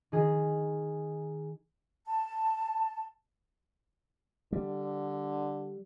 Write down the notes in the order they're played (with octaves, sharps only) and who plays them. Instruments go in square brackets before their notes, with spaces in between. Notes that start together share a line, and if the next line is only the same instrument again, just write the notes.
[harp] D#3 G#4
[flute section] A5
[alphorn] D3 [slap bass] G3